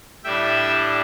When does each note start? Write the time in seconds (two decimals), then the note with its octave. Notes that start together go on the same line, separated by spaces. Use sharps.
0.24 A2 G3 D4 E5 G5